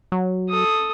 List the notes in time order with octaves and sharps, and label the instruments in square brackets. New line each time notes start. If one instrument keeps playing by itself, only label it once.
[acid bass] F#3
[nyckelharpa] A4 D#6